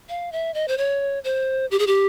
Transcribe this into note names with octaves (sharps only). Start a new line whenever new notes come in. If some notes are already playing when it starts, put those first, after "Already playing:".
F5
E5
D#5
C5
C#5
C5
G4
G#4
G4